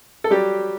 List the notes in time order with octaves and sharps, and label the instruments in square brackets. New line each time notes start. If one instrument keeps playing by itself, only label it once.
[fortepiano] A4
F#3 G3 G4